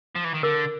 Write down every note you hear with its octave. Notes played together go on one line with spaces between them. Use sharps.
F3
E3
D#3
D3 A#4